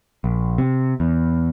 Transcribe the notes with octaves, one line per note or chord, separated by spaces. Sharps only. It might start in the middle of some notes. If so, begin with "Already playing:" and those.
A#1
C3
E2